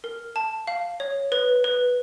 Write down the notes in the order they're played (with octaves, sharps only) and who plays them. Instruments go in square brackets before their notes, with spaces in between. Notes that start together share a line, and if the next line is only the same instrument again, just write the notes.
[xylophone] A#4
A5
F5
C#5
B4
B4